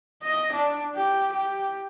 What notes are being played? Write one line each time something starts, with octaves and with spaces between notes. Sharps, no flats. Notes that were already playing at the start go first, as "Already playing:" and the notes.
D#5
D4
G4
G4